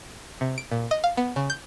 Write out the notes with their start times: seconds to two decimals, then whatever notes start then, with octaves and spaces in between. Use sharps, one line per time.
0.41 C3
0.58 D7
0.71 A#2
0.91 D#5
1.04 F5
1.17 B3
1.36 C#3
1.50 G6